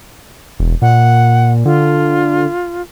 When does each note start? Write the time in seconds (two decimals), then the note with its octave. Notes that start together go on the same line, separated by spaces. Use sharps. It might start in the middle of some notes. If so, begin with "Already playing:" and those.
0.60 E1
0.82 A#2 F#5
1.65 D3 F4